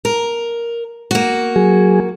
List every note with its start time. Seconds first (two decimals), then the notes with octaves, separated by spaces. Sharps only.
0.05 A#4
1.11 A#3 F#4
1.56 F#3 G#4